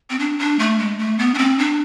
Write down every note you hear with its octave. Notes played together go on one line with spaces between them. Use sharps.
C4
D4
D4
A3
G#3
A3
B3
D4
C4
D4